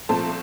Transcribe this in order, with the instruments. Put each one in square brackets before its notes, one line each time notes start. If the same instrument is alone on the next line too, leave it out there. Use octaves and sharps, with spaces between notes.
[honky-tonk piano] A#2 F3 A3 C4 A5